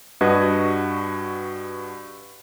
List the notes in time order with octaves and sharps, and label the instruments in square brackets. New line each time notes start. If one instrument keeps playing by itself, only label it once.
[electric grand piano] G2 D4 F#4 B4 D#5 G#6